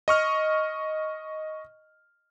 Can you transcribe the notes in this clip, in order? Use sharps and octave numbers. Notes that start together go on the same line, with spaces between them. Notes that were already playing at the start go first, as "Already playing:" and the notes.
D#5 C#6 F6